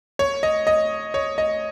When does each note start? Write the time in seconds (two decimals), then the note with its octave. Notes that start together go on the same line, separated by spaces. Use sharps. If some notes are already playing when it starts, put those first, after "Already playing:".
0.19 C#5
0.43 D#5
0.67 D#5
1.14 C#5
1.38 D#5